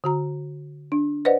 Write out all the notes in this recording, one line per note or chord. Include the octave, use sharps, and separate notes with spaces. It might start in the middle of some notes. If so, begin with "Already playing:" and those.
D3 F#4 A#5
D4
B4 C5 D5 D#5 F#5